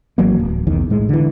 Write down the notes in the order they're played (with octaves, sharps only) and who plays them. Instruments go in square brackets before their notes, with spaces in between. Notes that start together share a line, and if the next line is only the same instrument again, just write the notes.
[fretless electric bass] G#1 E3 F#3 A#3
D1
B1 E2 D#3
A2 G#3
D3 E3